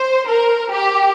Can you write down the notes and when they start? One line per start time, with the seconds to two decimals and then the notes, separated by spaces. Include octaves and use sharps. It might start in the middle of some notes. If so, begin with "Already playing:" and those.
Already playing: C5
0.29 A#4
0.74 G4